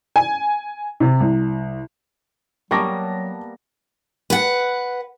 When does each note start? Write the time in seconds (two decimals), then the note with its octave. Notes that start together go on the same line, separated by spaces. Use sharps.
0.16 G#5
1.00 C3
1.20 C2
2.71 F#3 G3 A#3 B3 A5 C#6 D6 A#6
4.30 B4 F#5